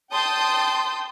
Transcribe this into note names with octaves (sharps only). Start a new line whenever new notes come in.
G5 A5 C6 D#6 G6